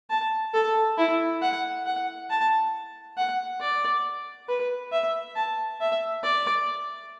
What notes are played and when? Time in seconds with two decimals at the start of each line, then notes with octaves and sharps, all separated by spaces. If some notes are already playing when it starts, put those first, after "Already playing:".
0.10 A5
0.54 A4
0.98 E4
1.42 F#5
1.86 F#5
2.30 A5
3.18 F#5
3.61 D5
4.49 B4
4.92 E5
5.36 A5
5.81 E5
6.23 D5